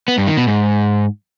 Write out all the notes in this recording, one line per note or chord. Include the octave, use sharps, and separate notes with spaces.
B3
G2
D#3
B2
G#2